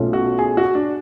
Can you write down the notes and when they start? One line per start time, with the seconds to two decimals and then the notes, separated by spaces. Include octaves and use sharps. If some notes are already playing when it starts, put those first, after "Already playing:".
Already playing: B1 B2 A3 C#4 F4
0.13 F#4
0.39 G#4
0.57 F#4
0.75 D4